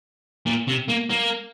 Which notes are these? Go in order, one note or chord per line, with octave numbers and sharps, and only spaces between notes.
A#2
C3
A#3
A#3